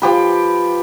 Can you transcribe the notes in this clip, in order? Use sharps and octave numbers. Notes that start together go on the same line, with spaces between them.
F3 G4 B4